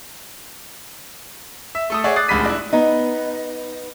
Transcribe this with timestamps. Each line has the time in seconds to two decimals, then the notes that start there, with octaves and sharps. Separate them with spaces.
1.75 E5
1.90 A3 A4 D#6
2.04 G#4 C#5 D5 E5 F#5
2.16 D6 D#6 F#6 A6 C7
2.28 D#1 D2 G#3 B5 B6 D#7
2.45 D4 E4
2.73 B3 D#4